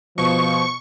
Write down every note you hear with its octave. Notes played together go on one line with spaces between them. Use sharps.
B2 F3 C#6